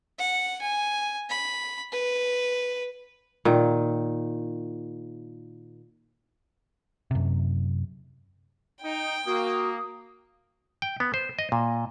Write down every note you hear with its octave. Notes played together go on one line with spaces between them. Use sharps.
F#5
G#5
B5
B4
A#2 D#3
F#2 C3
D#4 G5
A#3 F#4 D#6
G5
B3
C5
D#5
A#2